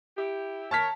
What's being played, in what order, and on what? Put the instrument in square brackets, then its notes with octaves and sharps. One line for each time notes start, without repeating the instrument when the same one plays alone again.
[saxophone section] E4 G4
[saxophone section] A#4 C#5 [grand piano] A5 F6 B6